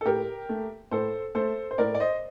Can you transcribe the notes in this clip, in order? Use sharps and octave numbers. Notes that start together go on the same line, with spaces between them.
A4
A2 G4 A#4
A3
A2 A4 C5
A3 A4 C5
C5
A2 A#4 D5
D5
C5 D#5